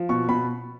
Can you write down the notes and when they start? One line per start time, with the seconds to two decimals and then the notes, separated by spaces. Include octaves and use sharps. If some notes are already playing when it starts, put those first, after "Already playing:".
Already playing: F3
0.09 B2 C#6
0.28 B2 B5